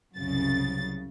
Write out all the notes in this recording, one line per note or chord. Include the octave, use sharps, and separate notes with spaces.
C2 F#2 C#3 A6